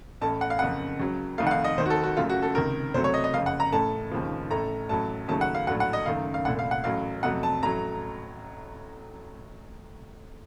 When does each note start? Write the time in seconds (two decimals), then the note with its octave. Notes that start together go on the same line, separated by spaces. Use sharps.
0.21 A1 A2 A3 A5
0.41 F#5
0.50 F5
0.59 F#1 F2 C#3 F#5
1.00 C#2 C#3 F#3
1.38 F1 F2 D#3 A3 F5
1.47 F#5
1.51 F5
1.64 D#5
1.78 F1 D#2 D#3 C5
1.86 F#4
1.90 A4
2.04 F#4
2.17 F#1 F#2 C#3 A3 F4
2.29 F#4
2.42 A4
2.55 C#2 C3 D#3 A#4
2.94 C2 C3 F#3 A3 C5
3.04 C#5
3.14 D#5
3.24 D#5
3.34 F#1 F2 C#3 F5
3.46 F#5
3.60 A#5
3.72 A1 A2 A3 A5
4.11 F1 D#2 C#3 F3
4.50 A1 A2 A3 A#5
4.89 A1 A2 F#3 A3 A5
5.28 D#2 C#3 F#3 A3 A5
5.41 F#5
5.55 F5
5.67 A#1 A2 F#3 F#5
5.80 F#5
5.93 D#5
6.06 F#1 F#2 D#3 A3 F5
6.34 F5
6.45 C2 A#2 A3 F#5
6.59 F5
6.71 F#5
6.84 A1 A2 F#3 F5
7.23 F2 C3 F#3 A3 F#5
7.43 A5
7.62 A1 A2 F#3 A3 A#5